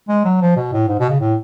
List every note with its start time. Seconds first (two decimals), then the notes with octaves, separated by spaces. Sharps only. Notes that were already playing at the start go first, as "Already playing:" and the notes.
0.09 G#3
0.25 F#3
0.41 F3
0.56 B2
0.73 A2
0.88 G#2
1.00 B2
1.10 C#3
1.21 A2